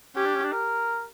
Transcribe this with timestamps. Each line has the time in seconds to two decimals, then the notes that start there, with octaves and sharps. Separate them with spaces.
0.16 C#4 G4
0.25 D4
0.35 C#4
0.44 D4
0.52 A#4